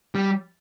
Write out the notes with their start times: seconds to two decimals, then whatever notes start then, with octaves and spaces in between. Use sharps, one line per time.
0.15 G3